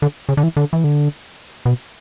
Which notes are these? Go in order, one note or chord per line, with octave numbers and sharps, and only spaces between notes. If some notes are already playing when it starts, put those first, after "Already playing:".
D3
C#3
D3
E3
D3
E3
D3
B2